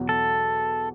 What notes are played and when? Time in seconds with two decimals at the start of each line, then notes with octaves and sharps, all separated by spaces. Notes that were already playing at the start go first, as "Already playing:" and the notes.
Already playing: E2 B2 F#3 B3
0.09 A4